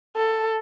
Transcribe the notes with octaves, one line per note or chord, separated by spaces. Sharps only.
A4